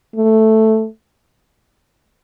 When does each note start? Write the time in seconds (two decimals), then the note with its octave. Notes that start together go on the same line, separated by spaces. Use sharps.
0.16 A3